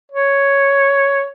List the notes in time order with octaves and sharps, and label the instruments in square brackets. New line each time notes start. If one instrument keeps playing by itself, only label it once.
[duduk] C#5